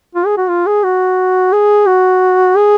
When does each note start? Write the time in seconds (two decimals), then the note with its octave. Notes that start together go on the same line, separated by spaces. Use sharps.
0.15 F4
0.26 G#4
0.38 F#4
0.49 F4
0.67 G#4
0.84 F#4
1.53 G#4
1.87 F#4
2.56 G#4